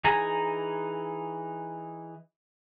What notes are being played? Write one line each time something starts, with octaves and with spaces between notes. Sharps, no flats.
E3 D#4 G#4 G#5 A#5